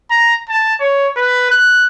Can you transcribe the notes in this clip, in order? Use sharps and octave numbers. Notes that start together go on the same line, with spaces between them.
A#5
A5
C#5
B4
F#6